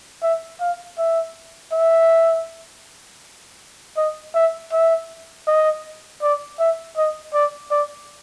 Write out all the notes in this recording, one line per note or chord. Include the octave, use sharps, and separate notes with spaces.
E5
F5
E5
E5
D#5
E5
E5
D#5
D5
E5
D#5
D5
D5